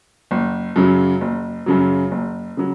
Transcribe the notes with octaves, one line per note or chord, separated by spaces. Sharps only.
F#1
F#2 C#3 F#3
F#1
F#2 C#3 F#3
F#1
C#3 F#3